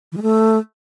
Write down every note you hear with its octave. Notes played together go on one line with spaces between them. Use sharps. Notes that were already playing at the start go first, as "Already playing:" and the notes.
E3
G#3
A3